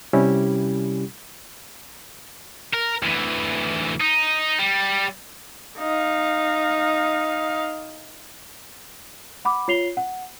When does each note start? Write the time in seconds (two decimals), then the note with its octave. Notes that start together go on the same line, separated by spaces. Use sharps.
0.13 C3 G3 C#4 E4 G4
2.74 A#4
3.03 D2 E3
4.01 D#4
4.59 G3
5.78 D#4 F5
9.45 F#5 B5 D6
9.68 F4 C#5 C7 F7 G7
9.97 F#5